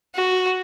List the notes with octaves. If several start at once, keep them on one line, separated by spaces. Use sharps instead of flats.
F#4